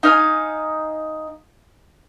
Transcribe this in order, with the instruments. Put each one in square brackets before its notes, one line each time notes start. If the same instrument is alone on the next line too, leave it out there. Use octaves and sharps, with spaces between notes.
[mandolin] D#4 F5 G#5